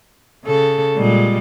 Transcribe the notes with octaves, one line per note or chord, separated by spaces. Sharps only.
C#3 A4
A#2 G3 G#3